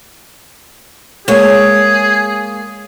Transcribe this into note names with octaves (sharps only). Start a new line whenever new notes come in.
G#3 A#3 G#4 C#5